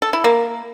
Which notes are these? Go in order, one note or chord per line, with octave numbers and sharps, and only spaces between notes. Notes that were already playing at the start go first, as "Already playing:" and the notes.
A4
E4
A#3